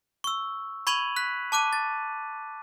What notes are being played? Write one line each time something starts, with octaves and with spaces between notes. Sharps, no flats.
C#6 E6
B5 C#6 G#6 D#7 F7 F#7
F#6 B6
A5 D6 F#6 D#7
A6